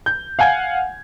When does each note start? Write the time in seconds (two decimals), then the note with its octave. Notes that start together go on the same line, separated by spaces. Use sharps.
0.06 G6
0.39 F5 F#5 G#5 G#6